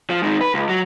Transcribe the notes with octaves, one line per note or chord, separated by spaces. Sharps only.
F3
D#3 G#3
B4
C#2
F#3